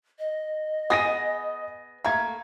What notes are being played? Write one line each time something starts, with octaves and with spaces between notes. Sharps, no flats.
D#5
B3 G#4 G#5 D#6 A#6 D#7
A3 A#3 A#5 G#6